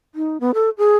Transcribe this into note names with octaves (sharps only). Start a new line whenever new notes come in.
D#4
B3
A4
G#4